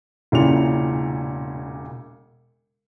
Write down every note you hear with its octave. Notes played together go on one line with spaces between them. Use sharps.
E1 A#2 C#3 E4 F7